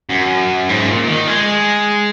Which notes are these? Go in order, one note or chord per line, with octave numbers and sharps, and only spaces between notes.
F#2
G#2
C#3
A#2
D#3
G#3